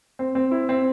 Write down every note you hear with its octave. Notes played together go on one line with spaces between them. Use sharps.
C4
C4
E4
C4